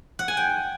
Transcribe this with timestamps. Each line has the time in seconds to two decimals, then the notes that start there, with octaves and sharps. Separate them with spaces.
0.19 F#5
0.28 G#5
0.37 G5